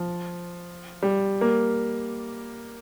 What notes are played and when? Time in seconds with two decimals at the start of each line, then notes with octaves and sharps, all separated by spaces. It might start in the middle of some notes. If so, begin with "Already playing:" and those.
Already playing: F3
1.02 G3
1.41 A#3